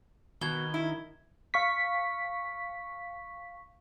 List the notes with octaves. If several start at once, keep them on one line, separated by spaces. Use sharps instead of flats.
B2 D#3 G#6 G7
E4
F5 C#6 B6